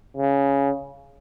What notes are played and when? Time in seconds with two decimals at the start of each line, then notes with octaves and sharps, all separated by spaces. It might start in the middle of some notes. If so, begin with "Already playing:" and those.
0.17 C#3